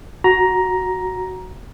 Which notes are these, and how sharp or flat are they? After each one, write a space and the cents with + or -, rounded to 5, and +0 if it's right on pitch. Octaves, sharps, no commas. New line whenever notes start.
F#4 +0 A#5 +10